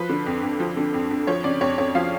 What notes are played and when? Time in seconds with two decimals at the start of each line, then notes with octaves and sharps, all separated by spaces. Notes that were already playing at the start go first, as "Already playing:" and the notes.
Already playing: F3 B4
0.10 D3
0.26 F2
0.43 F2
0.60 F3
0.77 D3
0.94 F2
1.11 F2
1.27 F3 C#5
1.44 C#3 D5
1.61 F2 C#5
1.78 F2 C#5
1.95 F3 F5